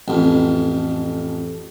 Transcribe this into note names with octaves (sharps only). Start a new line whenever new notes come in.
A1 F2